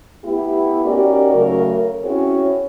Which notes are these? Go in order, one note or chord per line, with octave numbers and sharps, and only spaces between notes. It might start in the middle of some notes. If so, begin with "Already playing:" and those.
A3 B3 E4 G4
C#4 D#4 F#4 G4 A#4 D5
C#3 F#3 A3 A#4
C4 C#4 E4 F#4 G#4 C#5